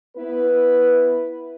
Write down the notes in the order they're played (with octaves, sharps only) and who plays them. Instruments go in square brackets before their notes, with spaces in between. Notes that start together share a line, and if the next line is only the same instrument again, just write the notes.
[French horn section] B3 E4 B4